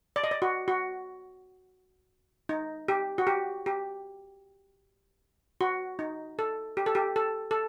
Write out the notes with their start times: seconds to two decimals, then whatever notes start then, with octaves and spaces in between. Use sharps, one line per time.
0.16 D5
0.24 D#5
0.31 D5
0.42 F#4
0.68 F#4
2.49 D#4
2.88 G4
3.18 F#4
3.27 G4
3.66 G4
5.61 F#4
5.99 D#4
6.39 A4
6.77 G4
6.86 A4
6.95 G4
7.16 A4
7.51 A4